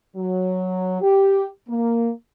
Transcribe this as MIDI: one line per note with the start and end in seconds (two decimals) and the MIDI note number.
0.16 1.00 54
1.02 1.47 67
1.69 2.10 58